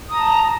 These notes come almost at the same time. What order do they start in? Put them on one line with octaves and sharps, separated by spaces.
D#6 A#5 A5